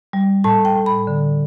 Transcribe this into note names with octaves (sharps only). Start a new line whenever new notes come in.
G3
A2 A5
G5
A2
B5
D3